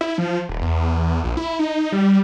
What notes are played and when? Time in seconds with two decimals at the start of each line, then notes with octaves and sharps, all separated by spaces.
0.01 E4
0.18 F3
0.49 D#1
0.62 E2
1.24 A#1
1.37 E4
1.59 D#4
1.92 G3